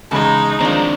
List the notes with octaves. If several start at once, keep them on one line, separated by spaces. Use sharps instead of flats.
E2 C#3 G#3 D#4 A5
D#3 F3 C4 D4